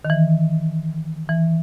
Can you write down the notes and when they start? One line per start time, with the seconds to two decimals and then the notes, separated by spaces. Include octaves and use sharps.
0.05 D#3
0.10 E3
1.29 E3